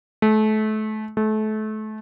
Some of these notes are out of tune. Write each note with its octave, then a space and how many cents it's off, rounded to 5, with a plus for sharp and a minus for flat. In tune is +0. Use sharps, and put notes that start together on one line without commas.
A3 -30
A3 -30